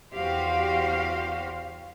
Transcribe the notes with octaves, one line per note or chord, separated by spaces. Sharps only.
E2 F#4 G4 C5 F5